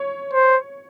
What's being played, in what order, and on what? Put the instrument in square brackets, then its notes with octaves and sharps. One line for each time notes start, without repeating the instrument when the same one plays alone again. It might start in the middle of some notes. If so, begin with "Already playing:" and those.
Already playing: [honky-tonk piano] C#5
[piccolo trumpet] C5